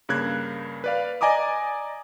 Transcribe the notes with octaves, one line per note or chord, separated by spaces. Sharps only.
G2 C#3 A#3 F#6 G#6
B4 D5 F5
D5 D#5 G#5 A#5 D6 D#6